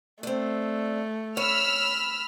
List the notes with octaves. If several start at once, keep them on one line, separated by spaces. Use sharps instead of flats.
A3 C4 D4
C#5 B5 E6 F6